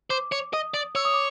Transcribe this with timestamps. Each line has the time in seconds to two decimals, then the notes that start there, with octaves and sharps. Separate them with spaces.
0.10 C5 D6
0.32 C#5
0.53 D#5 D#6
0.74 D5
0.95 C#5 E6
1.05 D#6
1.14 D6